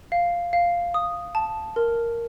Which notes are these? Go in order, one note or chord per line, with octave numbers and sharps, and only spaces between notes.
F5
F5
D#6
A5
A#4